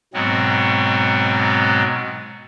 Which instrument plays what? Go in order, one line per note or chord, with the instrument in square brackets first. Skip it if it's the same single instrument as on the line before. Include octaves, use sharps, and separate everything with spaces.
[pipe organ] G#2 B2 F#3 G#3 B3 C4